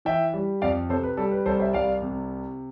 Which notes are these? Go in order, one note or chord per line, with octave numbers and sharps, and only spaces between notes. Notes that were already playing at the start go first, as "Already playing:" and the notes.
E3 E5 G5
G3
F2 D5 F5
C3 A4 C5
B4
G3 A4
B4
C2 A4 C5
C5 E5
C2 D5 F5
C3